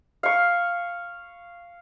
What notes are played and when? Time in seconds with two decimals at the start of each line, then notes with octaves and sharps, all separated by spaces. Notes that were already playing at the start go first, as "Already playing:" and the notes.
0.23 F5 C#6